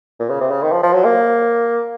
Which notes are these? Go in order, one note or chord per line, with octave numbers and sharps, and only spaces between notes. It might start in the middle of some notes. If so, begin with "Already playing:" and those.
A#2
C#3
C3
C#3
D#3
F3
F3
F#3
A#3